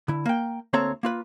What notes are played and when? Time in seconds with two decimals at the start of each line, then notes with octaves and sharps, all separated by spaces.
0.08 D3 E4
0.26 A#3 G5
0.73 D2 A#3 C4 A4 C#5 A#5
1.03 A#3 F4 B4